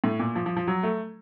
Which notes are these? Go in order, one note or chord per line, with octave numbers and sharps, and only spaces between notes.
A2
A#2
F3
F3
F3
F#3
A3